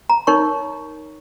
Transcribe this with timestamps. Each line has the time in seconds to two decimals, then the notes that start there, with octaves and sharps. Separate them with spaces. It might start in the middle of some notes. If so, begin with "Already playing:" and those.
0.10 A#5
0.27 D#4 A#4 C#5 C#6